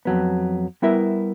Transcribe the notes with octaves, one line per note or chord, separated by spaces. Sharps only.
F2 F#3 B3
G3 B3 E4 A#4 E5